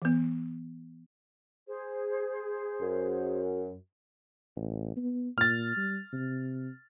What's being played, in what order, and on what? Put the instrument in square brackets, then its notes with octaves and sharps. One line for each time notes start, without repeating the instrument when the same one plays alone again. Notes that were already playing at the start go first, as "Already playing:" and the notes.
[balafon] E3 B3
[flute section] G#4 C5
[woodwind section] F#2
[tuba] A1
B3
[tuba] A#2 [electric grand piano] F6 A6
[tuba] G3
C3